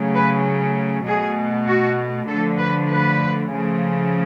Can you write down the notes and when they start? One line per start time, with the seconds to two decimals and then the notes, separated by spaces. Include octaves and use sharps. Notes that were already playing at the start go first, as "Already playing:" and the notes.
Already playing: C#3 F#3 A3
0.14 B4
1.06 B2 A3 G#4
1.67 F#4
2.28 D3 F3 A3 A4
2.59 B4
2.90 B4
3.51 C#3 F3 A3